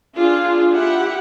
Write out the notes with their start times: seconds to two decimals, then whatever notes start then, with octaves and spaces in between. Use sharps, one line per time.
0.15 D4 F4 G#4
0.73 E4 G4 F#5